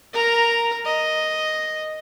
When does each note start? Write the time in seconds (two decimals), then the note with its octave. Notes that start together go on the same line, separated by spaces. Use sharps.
0.14 A#4 A#5
0.85 D#5